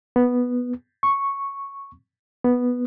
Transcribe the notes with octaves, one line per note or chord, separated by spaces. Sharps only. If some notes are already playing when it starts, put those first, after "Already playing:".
B3
C#6
B3